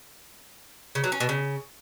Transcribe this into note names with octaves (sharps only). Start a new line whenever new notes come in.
C#3
F#3
C#4
B2
C#3